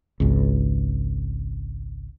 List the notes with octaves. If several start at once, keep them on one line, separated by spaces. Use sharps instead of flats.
G#1 C#2